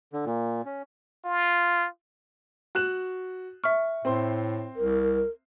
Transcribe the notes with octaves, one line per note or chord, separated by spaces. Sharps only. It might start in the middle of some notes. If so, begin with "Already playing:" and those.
D3
A#2
C#4
F4
F#4 F#6 E7
E5 C#6 F6
A2 C4 C6
C2 A#4